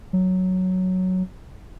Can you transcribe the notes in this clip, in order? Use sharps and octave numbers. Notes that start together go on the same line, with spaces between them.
F#3